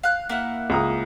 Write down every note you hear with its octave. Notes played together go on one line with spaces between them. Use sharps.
F5 F#6
A#3 E4 F#5
C#2 A#5 D#6